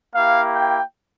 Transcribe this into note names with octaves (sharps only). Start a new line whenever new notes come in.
A#3 E4 G4 F5
G5